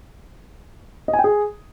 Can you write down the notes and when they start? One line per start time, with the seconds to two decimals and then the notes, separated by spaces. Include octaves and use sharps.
1.08 D#5
1.13 G#5
1.19 G5
1.24 G#4